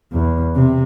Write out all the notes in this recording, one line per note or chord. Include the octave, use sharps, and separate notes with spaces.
E2
C3